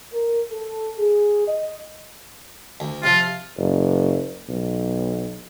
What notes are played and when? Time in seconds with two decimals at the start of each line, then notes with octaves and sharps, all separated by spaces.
0.12 A#4
0.51 A4
0.98 G#4
1.48 D#5
2.80 D2
3.04 C3 F3 F4
3.58 F#1
4.48 B1